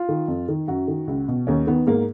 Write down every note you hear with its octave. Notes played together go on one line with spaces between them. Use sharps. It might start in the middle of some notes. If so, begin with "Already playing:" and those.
Already playing: F4
D#3
F2
D#3
F#2 F#4
D#3
C#2
B2
D#2 C#4
D#3 B3
G#2 A#3